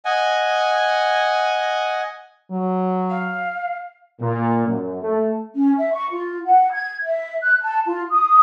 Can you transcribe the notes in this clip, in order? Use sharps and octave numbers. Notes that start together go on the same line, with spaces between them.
D#5 F#5 G#5
F#3
F5
A#2
F#2
A3
C#4
E5
C#6
F4
F#5
G#6
E5
F#6
A5
F4
D#6